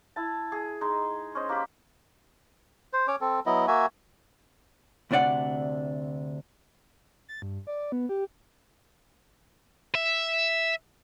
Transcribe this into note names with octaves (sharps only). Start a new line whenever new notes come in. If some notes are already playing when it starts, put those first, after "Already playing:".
E4 A5
G#4
G#3 D#4
C#4 C5 D#5
A#3 G4 B5
C5
C#4 C#5 D6
C4 A4
F#3 B3 E4 D#5
A#3 F#4 E5 G#5
D2 C3 D4 D5 F#5
A6
G2
D5
B3
G4
E5